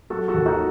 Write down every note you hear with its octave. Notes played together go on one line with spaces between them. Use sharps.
F#3 F#4 A4
F#4 A4
D#2
D#4 F#4